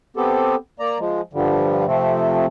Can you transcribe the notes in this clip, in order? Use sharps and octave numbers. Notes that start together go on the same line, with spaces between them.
B3 C4 G4 A4
A#3 D5 A#5
F3 G#3
G2 D3 F3 G3
C3 F3 A3 C4